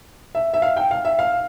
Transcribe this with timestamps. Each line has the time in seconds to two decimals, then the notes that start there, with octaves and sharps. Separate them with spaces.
0.35 E5
0.54 E5
0.62 F5
0.77 G5
0.91 F5
1.05 E5
1.19 F5